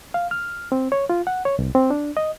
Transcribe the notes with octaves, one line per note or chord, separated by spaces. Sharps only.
F5
F6
C4
C#5
F4
F#5
C#5
C2
C4
D4
D#5